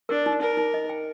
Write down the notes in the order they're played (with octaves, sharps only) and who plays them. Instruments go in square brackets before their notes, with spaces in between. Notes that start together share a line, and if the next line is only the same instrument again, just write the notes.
[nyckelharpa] D4 [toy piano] A#4
[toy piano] D#4
[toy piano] D#4 [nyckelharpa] A#4
[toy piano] D#4
D#5
G5